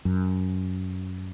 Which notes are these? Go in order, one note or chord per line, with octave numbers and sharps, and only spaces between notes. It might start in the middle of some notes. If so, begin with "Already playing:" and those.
F#2